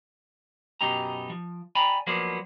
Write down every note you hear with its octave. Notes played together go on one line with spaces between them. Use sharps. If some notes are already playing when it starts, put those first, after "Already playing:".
F#2 B2 D#4 G4 A#5
F3
D5 G5 G#5 A#5 B5
F3 F#3 A#3 B3 C5 D5